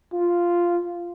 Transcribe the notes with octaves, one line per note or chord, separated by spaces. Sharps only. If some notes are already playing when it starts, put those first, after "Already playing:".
F4